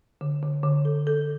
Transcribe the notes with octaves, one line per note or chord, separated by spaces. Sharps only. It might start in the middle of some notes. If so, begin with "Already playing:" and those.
D3
D3
D3
A4
A4